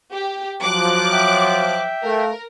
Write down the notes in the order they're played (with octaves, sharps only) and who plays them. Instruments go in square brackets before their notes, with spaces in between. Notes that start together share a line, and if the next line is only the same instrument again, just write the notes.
[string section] G4
[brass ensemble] F3 F#3 [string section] D6 F#6
[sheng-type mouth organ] E5 G5
[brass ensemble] A3 F5 [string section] A#4